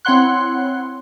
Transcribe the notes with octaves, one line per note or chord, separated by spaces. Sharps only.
C4 E4 C#5 F#5 C6 F#6